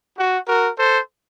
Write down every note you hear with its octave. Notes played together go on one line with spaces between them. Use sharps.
F#4
F#4 A#4
A4 C5